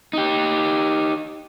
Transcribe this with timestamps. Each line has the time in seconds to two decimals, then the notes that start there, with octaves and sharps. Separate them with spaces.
0.13 D#4 G4